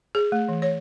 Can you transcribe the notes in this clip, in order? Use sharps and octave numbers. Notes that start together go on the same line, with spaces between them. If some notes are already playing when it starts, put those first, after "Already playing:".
G#4
A3
E3
C#5